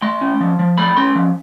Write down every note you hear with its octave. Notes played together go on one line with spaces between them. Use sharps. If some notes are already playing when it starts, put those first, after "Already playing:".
A3 C6
C#4
F3
F3
A3 B5
C#4 C6
F3